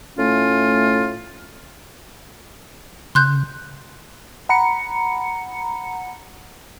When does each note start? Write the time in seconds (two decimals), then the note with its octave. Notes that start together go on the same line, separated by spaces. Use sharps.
0.17 A2 A3 C#4 F4
3.15 C#3 C6 F#6 G6
4.49 F#5 A#5 B5 C#7